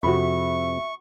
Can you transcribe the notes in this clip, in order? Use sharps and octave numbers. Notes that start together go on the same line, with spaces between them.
F2 C3 F#4 E5 B5 C#6